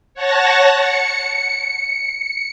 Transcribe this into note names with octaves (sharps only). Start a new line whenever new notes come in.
C#5 F#5 A5 A#6
C#7